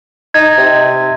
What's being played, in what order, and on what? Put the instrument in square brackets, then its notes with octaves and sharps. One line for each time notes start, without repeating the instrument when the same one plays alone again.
[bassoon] D#4 [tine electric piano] G#6
[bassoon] C3